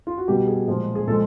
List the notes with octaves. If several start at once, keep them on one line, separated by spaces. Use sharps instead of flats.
F4
F#4
B2 G3 G4
G#4
A#2 F3 G#3
G#4
A#2 F3 G#3 A4